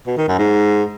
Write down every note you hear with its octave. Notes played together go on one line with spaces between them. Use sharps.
B2
D#3
F#2
G#2